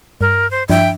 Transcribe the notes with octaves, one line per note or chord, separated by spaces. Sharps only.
G2 A#4
C5
G2 F3 D4 E5 G5